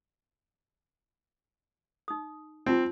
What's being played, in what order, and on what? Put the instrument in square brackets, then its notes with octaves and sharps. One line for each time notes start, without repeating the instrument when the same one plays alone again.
[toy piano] D#4 D#6
[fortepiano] C4 [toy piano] D#4 F4